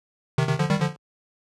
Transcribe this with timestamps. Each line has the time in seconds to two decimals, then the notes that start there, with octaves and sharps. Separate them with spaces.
0.38 C3 D#3
0.48 C3 D#3
0.59 D3 F3
0.69 D#3 G3
0.80 D3 F3